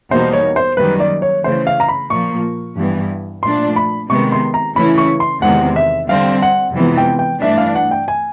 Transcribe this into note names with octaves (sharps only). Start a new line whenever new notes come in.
E2 B2 G3 A#3 D#4 C5
C#5
C5
F#2 D#3 G3 A#3 B4
D5
C#5
C#3 E3 A3 C5
F5
A#5
B5
A#2 F3 A#3 C#6
G2 E3 G3 B3
A#2 F3 A3 D4 C6
B5
C3 D#3 G#3 B3 C#6
C6
A#5
C#3 E3 A3 C#4 E4 B5
C#6
C6
E2 C3 D#3 G#3 C4 F#5
E5
D3 G3 C4 F5
F#5
F2 C3 E3 G#3 B3
G5
G5
G2 E3 A3 D4 E5
F5
F#5
G5
G#5